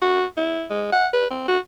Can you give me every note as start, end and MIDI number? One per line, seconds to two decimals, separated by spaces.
0.02 0.24 66
0.37 0.65 64
0.70 0.92 56
0.92 1.07 78
1.13 1.30 71
1.30 1.47 60
1.48 1.58 66